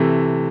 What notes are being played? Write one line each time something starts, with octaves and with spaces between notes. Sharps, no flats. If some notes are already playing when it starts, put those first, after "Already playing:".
Already playing: C3 E3 A3